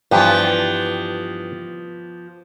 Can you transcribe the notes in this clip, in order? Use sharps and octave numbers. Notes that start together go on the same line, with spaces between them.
G2 E3 F3 B3 G4